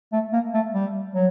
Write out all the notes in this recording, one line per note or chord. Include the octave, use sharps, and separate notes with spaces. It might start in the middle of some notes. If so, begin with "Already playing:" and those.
A3
A#3
A3
G3
F#3